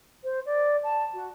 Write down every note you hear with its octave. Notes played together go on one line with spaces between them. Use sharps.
C5
D5
A5
F#4